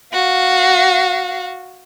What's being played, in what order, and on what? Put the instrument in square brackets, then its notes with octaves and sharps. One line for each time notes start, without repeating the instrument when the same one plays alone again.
[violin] F#4 F5